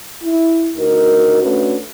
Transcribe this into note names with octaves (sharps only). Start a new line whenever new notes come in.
E4
D2 D#4 F#4 A#4
A3 C#4 D4 F#4 B4